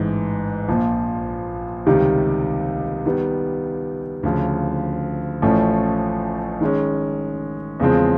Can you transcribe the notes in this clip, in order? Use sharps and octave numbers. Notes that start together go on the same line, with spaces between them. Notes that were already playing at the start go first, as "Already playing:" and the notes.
Already playing: A1 G#2 E3
A#1 A#2 F3
C#2 C3 D#3 G3
D#3 G3 B3
D2 C#3 F3
A1 A2 F3 A3 C#4
D#3 G#3 C#4
E2 C#3 F3 G#3 C4